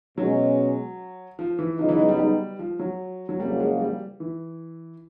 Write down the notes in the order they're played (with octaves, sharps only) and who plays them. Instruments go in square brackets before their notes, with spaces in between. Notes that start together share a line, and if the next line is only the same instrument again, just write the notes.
[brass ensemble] B2 G#3 C#4 [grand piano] F#3
[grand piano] F3
E3
[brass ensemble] C#3 F#3 B3 D#4 [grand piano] F3
[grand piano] E3
G#3
G3
G3
F3
F#3
F#3
[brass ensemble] F#1 F2 C#3 F#3 A#3 [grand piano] G3
[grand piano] G#3
G3
E3